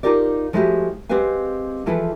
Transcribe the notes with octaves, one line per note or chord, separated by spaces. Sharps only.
D#4 F4 G4 A#4 D5
F3 G#3 A3 E4 F#4 G4
G#3 C4 G4 B4 F5 G#5
E3 F3 E4 G#4 A4 B4